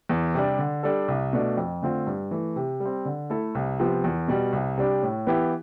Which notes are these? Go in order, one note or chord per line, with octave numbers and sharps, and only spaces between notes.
E2
C3 G3 D4
D3
G3 D4 A4
C2
B2 A3 D4
F2
D3 A3 C4 F4
G2
E3 A3
C3
G3
C4
D3
A3 E4 A4
C2
C3 F3 B3
E2
B2 G3
C2
C3 G3 D4
A2
E3 B3 E4 G4